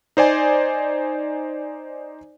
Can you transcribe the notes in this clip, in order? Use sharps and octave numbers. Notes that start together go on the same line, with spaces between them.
D#4 C5 D5 G#5